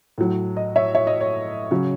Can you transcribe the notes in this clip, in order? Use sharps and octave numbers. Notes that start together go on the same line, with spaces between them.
A2 F#3
D#5
C#5 E5
C#5 E5
D#5
C#5
C#3 F#3